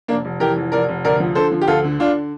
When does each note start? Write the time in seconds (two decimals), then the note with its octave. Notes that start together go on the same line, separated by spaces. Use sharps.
0.08 F1 A#3 D4
0.25 F1
0.40 E3 G4 A#4
0.56 F1
0.72 F1 A#4 D5
0.89 F1
1.04 D2 A#4 D5
1.20 F3
1.35 D3 A4 C5
1.52 F3
1.62 G4
1.67 D2 F4 A4
1.84 D3
1.99 D3 D4 F4